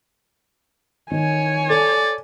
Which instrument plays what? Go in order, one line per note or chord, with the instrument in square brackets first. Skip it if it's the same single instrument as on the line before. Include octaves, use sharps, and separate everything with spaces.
[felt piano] D#3 [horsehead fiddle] C#5 G#5
[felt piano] A4 [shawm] D5